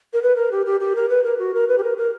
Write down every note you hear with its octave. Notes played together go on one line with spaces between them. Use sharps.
A#4
B4
A#4
G4
G4
G4
A#4
B4
A#4
F#4
A#4
B4
G4
A#4
A#4